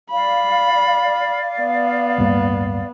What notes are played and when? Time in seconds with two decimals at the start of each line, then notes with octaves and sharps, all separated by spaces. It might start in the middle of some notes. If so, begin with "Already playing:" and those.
0.10 D5 F5 B5
1.61 B3
2.18 D1 G2 A#3